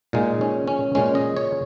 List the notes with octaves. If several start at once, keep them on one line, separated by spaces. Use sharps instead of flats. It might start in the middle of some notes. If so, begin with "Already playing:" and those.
A#2 G#3 D#4
C#4
C#4
A#2 G#3 C#4
D#5
C#5